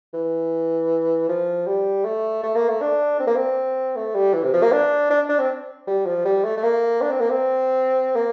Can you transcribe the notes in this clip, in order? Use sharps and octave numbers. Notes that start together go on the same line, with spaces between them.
E3
F3
G3
A3
A3
A#3
A3
D4
C4
A#3
C4
A3
G3
E3
C3
F3
A#3
D4
D4
D4
C4
G3
F3
G3
A3
A3
A#3
D4
C4
A#3
C4
A#3